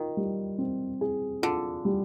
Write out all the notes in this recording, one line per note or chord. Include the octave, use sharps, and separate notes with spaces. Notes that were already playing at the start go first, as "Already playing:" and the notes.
Already playing: D#3 F4
G3
C4
G#4
D3 F4
G3